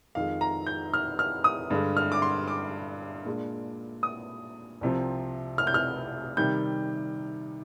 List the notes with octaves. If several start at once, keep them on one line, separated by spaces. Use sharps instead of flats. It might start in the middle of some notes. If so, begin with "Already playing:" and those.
F2 D#3 G#3 F5
A#5
G6
F6
F6
D#6
G2 D3 G#3
F6
D6
C6
D6
A#2 G#3 D4
D#6
C2 C3 F3 C4
F6
G6
F6
C3 D#3 G3 G6